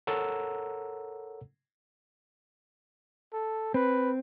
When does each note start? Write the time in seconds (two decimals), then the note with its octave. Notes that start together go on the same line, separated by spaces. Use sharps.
0.07 A4 A#4 C#5 F#5 A#5 E6
3.33 A4
3.74 C4 B4